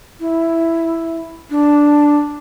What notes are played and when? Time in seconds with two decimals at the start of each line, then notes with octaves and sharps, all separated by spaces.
0.20 E4
1.50 D4